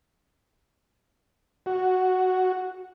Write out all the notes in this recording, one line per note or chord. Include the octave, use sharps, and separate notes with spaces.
F#4